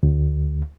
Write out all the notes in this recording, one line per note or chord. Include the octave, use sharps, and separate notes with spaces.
D2